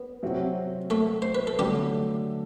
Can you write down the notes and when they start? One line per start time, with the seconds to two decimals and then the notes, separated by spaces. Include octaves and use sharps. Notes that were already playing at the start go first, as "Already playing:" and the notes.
Already playing: B3
0.23 C3 F#3 C4 F#4
0.90 A3 A4
1.22 C5
1.35 B4
1.47 A4
1.59 D3 F#3 G3 A3 G4